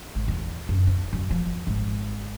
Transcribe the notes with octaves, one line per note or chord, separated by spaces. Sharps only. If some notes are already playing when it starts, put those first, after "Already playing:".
G#1
E2
F#2
D#4
F#2
F3
G#1